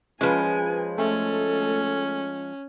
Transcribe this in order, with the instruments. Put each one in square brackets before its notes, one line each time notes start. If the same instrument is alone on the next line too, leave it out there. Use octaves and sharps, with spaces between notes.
[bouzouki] F3 G#3 [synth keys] C#4 F4 B4 [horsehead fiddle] G#5
[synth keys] A3 [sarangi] C#4 [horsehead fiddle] A4